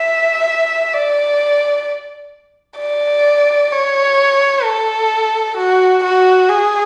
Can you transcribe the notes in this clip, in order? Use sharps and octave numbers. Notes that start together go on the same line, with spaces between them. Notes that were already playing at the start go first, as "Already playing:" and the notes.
Already playing: E5
D5
D5
C#5
A4
F#4
F#4
G#4